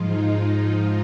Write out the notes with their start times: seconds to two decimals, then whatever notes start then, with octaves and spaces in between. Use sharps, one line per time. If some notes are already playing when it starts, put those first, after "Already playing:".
Already playing: G#2 F3 G#3 D#4 F4
0.25 F4
0.59 F4